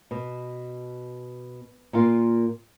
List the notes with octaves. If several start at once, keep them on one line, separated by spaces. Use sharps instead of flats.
B2
A#2 A#3 F4